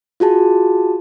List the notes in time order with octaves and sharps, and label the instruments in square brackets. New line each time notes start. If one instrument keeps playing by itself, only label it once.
[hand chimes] F4 F#4 G#4 A5